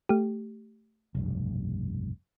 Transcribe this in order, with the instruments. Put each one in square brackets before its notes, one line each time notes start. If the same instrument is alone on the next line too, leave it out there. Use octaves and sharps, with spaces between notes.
[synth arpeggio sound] A3 G4
[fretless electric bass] F1 B1 G2